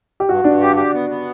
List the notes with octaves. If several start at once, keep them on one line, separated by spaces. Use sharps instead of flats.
G4
G2 F#4
G2 D4
G4
G4
B3
B3